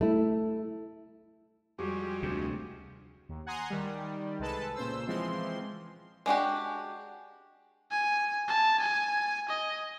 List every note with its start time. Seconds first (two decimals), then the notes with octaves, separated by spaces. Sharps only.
0.01 A3 E4
1.79 F2 G3 G#3 F#4 G4
2.23 D2 C3
3.29 D#2
3.46 F#5 G#5 A#5 C6 D#6
3.70 D#3 G3
4.39 C2 G#3 A4 B4 A5
4.75 A#2 C#3 C5 E6
5.07 E3 F3 G#3 C4 C6
6.26 G#3 D4 F#4 G4
7.91 G#5
8.48 A5
8.80 G#5
9.49 D#5